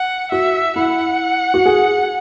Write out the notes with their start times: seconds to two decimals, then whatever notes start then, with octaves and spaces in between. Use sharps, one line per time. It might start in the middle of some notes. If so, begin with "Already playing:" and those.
Already playing: F#5
0.31 F#4 E5
0.76 E4 F#5
1.54 F#4
1.66 G#4